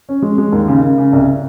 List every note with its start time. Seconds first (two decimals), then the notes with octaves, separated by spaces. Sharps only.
0.09 C#4
0.22 G#3
0.38 G#3
0.52 D#2
0.68 C#3
0.82 C#3
0.98 C#3
1.13 C2